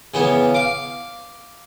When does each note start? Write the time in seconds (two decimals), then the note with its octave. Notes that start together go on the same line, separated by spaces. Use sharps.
0.14 C#3 E3 B3
0.55 F5 D6